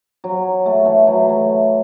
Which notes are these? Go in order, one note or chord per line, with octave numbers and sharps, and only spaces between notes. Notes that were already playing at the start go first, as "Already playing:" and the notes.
F#3
A3
E3
F#3
A3